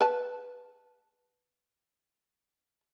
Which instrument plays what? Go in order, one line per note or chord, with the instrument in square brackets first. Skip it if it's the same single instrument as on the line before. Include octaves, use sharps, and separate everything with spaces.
[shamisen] B4 A5